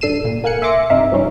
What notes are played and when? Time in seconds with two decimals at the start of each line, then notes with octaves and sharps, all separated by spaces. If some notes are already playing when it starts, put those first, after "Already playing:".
0.01 G2 D4 A4 C7 D#7 E7
0.25 A#2
0.44 A#3 F5 G#5 F#6 C#7
0.62 E5 G#5 C6 D6 A#6 C#7
0.90 G2 C3 D#4 E5 F5
1.12 F3 G3 C#4 D#4